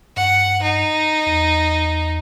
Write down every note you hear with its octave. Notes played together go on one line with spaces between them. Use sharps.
G2 F#5
D#4
E2